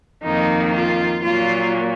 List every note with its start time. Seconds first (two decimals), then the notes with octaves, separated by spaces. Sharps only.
0.23 F2 D#3 A#3 D#4
0.74 F4
1.24 A#2 F#3 A#3 F4